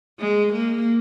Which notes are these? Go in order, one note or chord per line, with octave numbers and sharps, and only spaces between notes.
G#3
A#3